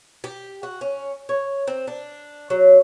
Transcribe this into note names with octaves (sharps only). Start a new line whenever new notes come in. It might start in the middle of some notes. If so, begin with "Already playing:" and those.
G4
F#4
C#4
C#5
C4
D4
F#3